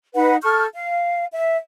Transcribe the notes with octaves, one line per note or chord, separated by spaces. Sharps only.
D#4 B4 F#5
A4 C#6 F6 G6
F5
E5